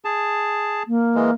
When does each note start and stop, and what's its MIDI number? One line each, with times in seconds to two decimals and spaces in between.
0.05 0.83 68
0.05 0.83 81
0.88 1.33 58
1.15 1.31 52
1.15 1.31 56